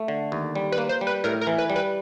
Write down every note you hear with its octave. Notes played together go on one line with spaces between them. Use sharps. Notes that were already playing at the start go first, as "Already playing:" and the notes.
Already playing: A3
D3
D#2
G3
B4
A#3
C5
G3
B4
A2 A#4
A#4
E3
B4
G3
B4